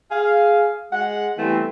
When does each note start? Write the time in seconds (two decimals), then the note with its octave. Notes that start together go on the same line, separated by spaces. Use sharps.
0.11 G#4 F5
0.93 G#3 F#5
1.38 E3 G3 A3 B3 C4